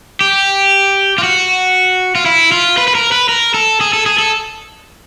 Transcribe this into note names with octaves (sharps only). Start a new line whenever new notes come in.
G4
F4
F#4
F4
E4
F4
B4
B4
A#4
B4
A#4
A4
G#4
A4
G#4
A4